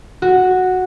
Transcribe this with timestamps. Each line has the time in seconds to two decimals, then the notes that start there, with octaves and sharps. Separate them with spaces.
0.22 F#4